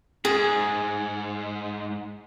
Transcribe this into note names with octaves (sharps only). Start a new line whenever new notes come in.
G#2 G#4